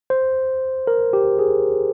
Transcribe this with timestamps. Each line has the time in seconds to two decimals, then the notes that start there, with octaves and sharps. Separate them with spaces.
0.10 C5
0.87 A#4
1.13 G4
1.39 G#4